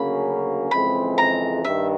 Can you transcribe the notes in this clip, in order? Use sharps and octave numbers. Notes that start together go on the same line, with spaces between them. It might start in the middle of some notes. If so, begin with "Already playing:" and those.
Already playing: D2 C#3 F#3 A#3 C#4 B5
F2 C#3 E3 G#3 C4 B5
A#5
G2 D#3 E5